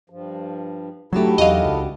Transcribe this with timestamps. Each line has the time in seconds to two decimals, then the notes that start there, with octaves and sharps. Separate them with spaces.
0.10 G2 F3
1.13 G#2 F#3 A3 D4 E4 F#4 G4 A4
1.38 E2 F#3 D#5 F5
1.65 C#2